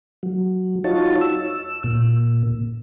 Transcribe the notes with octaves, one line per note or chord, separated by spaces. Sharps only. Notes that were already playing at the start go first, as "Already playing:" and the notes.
F#3
D#4 F4 F#4 C#5 A5
E6
A#2